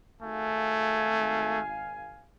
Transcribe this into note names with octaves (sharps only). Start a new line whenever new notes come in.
G#1 A3 F5 G#5